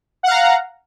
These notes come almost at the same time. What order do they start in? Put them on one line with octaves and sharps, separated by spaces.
F#5 F5 A#5